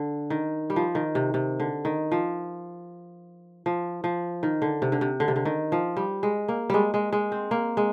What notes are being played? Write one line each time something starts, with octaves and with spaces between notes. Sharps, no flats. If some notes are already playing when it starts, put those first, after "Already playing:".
Already playing: D3
D#3
G3
F3
D#3
C3
C3
D3
D#3
F3
F3
F3
D#3
D3
C3
D3
C3
D3
C3
D3
D#3
F3
G3
G#3
A#3
G3 G#3
G#3
G#3
C4
A#3
G#3